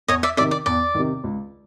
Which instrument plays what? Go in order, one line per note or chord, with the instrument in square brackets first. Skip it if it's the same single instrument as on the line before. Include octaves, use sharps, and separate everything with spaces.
[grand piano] E2 [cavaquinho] C#5 D#5
[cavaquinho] D5 E5
[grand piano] C3 D#3 [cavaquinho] D5 E5
[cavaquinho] D5
[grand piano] E2 [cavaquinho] D5
[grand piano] C3 D#3
C#2